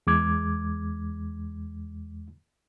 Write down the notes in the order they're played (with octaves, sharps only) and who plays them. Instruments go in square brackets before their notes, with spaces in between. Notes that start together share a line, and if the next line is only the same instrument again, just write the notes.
[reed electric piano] E2 G#3 D6 G#6